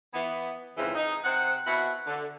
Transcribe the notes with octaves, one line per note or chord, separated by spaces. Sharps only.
E3 B3
F2 G#2 C#3 E3
D#4
C3 C5 F#5
B2 E4 F#5
D3